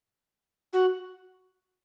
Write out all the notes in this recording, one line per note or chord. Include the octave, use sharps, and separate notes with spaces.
F#4